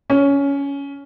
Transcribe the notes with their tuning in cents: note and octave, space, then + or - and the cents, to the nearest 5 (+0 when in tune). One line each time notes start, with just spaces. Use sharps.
C#4 +15